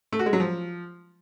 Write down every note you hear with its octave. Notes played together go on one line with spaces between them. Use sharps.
A3
F#4
G#3
F#3
F3